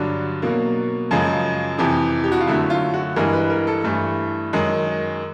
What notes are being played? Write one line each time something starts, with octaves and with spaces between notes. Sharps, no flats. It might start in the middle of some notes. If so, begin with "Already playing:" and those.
Already playing: G2 D3 F#3 D4
B2 F#3 A#3
F#2 C#3 F3 G#3
F2 C3 E3
G4
F#4
F4
F#2 D3 F#3 A3 E4
F4
F#4
G2 E3 G#3 A#4
B4
A#4
A4
G2 E3 A3
F#2 D#3 G#3